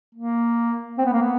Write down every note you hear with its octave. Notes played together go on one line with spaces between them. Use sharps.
A#3
C4
B3
A#3
B3